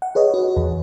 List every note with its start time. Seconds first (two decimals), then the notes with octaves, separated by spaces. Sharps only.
0.02 F#5
0.15 G#4 B4 C#5 D#5
0.34 F#4
0.57 E2